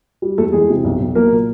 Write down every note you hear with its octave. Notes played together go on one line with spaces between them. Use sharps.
G3
E2 A3 A4
E3 G#3 G#4
C3
B1
B1
F#3 A#3 A#4
A#2